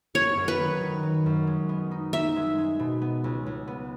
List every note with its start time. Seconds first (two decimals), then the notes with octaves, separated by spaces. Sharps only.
0.14 F#2 C#5
0.37 F#2
0.48 B4
0.59 D#3
0.81 D#3
1.03 F#3
1.26 F#2
1.47 G#3
1.69 B3
1.91 D#4
2.13 D#4 E5
2.36 G#3
2.58 G#3
2.79 B2
3.01 B3
3.24 C#2
3.46 C#2
3.68 B3